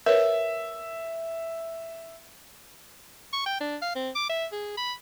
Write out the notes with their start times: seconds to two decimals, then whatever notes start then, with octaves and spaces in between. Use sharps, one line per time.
0.06 A#4 B4 C#5 E5
3.33 C#6
3.46 G5
3.61 D4
3.82 F5
3.95 C4
4.15 D6
4.29 E5
4.52 G#4
4.77 B5